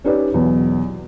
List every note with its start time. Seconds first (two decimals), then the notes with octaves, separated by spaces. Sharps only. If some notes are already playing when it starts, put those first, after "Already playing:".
0.04 C#4 D#4 G4 B4 C#5 D5
0.34 E2 B2 F#3